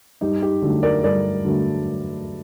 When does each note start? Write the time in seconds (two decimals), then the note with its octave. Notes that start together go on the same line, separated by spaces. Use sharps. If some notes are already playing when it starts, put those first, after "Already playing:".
0.21 G2 D#4 G4
0.42 D#4 G4
0.62 D3 F#3 A3
0.83 A#4 D5
1.04 G2 A#4 D5
1.45 D3 F#3 A3